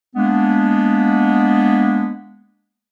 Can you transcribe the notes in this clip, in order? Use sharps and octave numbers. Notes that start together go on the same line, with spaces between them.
G#3 A#3 B3 D4